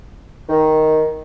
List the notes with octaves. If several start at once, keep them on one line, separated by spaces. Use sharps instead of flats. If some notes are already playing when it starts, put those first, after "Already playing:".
D#3